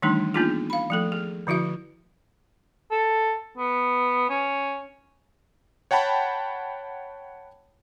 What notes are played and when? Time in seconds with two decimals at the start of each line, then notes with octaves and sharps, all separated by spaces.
0.02 D#3 E3 G3 A3 D4 D#4
0.34 A#3 B3 D4 D#4 F4 G#4
0.70 F5 B5
0.90 F3 A3 A4
1.12 G#4
1.47 D3 F3 E4 F#4 E5
2.91 A4
3.58 B3
4.30 C#4
5.91 C#5 F#5 G5 A5 B5